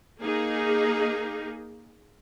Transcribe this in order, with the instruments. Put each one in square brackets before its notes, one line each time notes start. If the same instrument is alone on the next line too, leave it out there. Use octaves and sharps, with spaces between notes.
[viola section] A#3 D#4 G#4